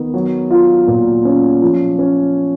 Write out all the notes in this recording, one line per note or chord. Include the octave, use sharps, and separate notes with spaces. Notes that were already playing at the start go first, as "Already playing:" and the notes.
Already playing: D#3 B3
F#3
F4
A#2
C#4
F3
C#4